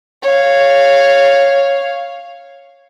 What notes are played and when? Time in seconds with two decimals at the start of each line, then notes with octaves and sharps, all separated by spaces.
0.23 C#5 F5